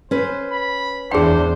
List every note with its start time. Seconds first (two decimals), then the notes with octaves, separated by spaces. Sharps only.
0.11 C#4 B4 C5
0.52 B5
1.11 E2 D4 G#4 C5 G5